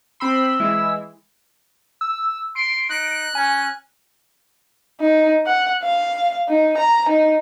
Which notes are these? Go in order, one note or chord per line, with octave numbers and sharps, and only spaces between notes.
C4 B5 C6 E6
E3 G#3 E4
E6
C6 D7
D#4 F#6
C#4 G#5
D#4
F#5
F5
D#4
A#5
D#4